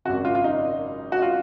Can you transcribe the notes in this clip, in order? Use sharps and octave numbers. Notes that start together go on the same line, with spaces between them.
G#1 F#2 C#3 F#4
F4
F4
D#4
F#4
F4